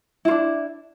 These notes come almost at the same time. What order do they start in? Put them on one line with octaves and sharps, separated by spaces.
E4 F4 D4